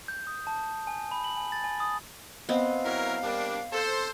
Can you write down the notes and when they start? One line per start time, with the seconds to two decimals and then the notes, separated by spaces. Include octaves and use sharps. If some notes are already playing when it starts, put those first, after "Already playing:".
0.08 G6
0.27 D#6
0.47 A5
0.87 G#5
1.11 B5
1.24 F#7
1.37 G#5
1.52 A6
1.64 G#5
1.80 D#6
2.49 B3 C4 D#5 F5
2.85 F#3 E4 A#4
3.23 G3 A#3 D4
3.73 A4 C5